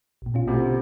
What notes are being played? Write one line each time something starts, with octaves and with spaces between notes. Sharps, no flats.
A#1 A#2
B2 C#4 F4
D2 C3